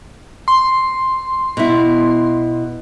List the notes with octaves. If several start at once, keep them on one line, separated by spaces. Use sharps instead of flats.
C6
B2 E4